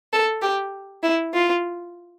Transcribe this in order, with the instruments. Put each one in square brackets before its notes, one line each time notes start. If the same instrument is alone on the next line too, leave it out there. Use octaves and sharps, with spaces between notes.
[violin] A4
G4
E4
F4